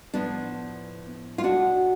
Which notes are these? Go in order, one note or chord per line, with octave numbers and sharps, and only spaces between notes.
A2 F3 B3 D4
F4
B2 D4 F#4